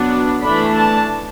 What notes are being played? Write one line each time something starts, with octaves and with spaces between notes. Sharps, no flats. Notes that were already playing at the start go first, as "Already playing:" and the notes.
Already playing: F#3 B3 D4
E3 A3 D4 B5
A5